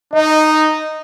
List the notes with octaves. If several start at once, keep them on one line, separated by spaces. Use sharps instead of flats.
D#4 D#5